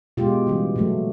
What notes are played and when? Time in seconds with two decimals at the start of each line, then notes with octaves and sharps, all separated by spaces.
0.17 B2 G#3 F4 G4
0.47 C#3 E3 G3
0.76 A#2 F#3 A3